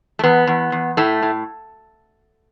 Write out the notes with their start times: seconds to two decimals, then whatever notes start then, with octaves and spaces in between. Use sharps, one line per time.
0.19 A3
0.23 E2 B3
0.47 E2
0.72 E2
0.97 A2 A3
1.22 A2